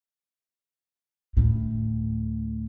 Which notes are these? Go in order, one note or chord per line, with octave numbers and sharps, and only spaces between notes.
D2 A2